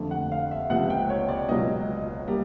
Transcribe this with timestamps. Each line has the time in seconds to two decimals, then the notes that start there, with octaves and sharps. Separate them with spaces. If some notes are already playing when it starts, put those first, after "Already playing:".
Already playing: F2 D3 F3 A3
0.11 F#5
0.32 F5
0.51 E5
0.70 C#2 C3 F3 F#5
0.90 G5
1.10 C#5
1.29 D5
1.48 C#2 B2 F#3 D#5
2.27 G3 A#3